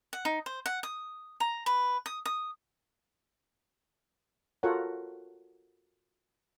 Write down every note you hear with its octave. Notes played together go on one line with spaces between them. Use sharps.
F#5
D#4
C5
F#5
D#6
A#5
B4
D#6
D#6
F4 F#4 A4 A#4 C#5 F#5